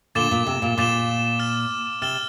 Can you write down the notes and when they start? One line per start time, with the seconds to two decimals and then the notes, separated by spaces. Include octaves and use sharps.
0.15 A#2 D3 D6 A6 E7 G7
0.31 A#2
0.47 C3
0.62 A#2
0.78 A#2 D6 A6 E7 G7
1.39 F6 A6 E7 G7
2.02 C3 F6 A6 E7 G7